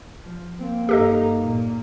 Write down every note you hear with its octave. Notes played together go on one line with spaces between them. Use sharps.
F3
A#3 C4
G2 D#4 G4 A4 D#5
A#2